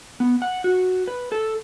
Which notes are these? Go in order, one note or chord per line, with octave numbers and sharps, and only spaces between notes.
B3
F#5
F#4
B4
A4